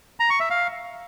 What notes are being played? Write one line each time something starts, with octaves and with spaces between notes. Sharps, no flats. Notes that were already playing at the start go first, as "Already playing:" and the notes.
A#5
C#6
E5
F5